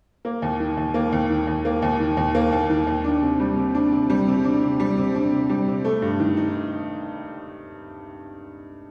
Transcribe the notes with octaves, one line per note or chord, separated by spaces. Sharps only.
A#3
D#2
D#3
D#2
A#3
D#2
D#3
D#2
A#3
D#2
D#3
D#2
A#3
D#2
D#3
D#2
D4
C3
G3
C3
D4
C3
G3
C3
D4
C3
G3
C3
D4
C3
G3
C3
A3
G2
D#3
D#4